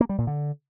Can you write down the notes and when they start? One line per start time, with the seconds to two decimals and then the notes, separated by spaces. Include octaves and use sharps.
0.01 A#3
0.09 G3
0.18 A#2
0.27 D3